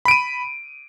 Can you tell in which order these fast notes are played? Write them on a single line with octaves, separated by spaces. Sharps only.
B5 D7 D#7